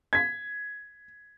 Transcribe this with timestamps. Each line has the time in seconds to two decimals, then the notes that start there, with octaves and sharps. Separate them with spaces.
0.13 G#6 B6